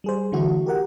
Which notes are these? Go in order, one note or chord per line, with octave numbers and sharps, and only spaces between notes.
G3 G#4 C5
D3 E3 A3 E4 F#4
G4 A#4 F#5